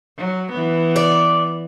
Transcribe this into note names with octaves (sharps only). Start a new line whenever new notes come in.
F#3
E3 B3
D5